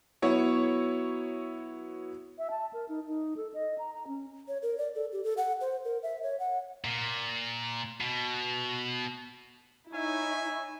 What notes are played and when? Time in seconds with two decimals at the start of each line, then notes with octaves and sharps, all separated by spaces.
0.22 F#3 B3 E4 C#5
2.38 E5
2.51 A5
2.73 A#4
2.89 D#4
3.07 D#4
3.37 A4
3.54 D#5
3.78 A#5
3.93 A#5
4.07 C#4
4.48 C#5
4.63 A#4
4.78 D5
4.95 A4
5.13 G4
5.24 A4
5.37 F#5
5.61 C5
5.84 A#4
6.03 E5
6.23 C#5
6.40 F#5
6.84 A#2
8.01 B2
9.93 D#4 E4 C#5 E5 G#5